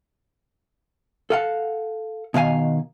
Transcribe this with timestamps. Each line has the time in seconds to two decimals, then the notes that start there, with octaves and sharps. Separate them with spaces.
1.30 A4 F5 F#5
2.34 B2 D#3 F5 G#5